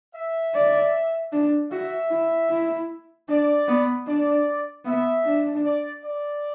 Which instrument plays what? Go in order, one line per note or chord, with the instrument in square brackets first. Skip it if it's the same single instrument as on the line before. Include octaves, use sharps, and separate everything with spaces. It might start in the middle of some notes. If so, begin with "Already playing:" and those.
[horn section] E5
[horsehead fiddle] D5
D4
[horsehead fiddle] F#4 [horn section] E5
[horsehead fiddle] E4
E4
[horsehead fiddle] D4 [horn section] D5
[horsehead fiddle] B3
[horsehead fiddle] D4 [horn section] D5
[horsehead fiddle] B3 [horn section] E5
[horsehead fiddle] D4
[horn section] D5
D5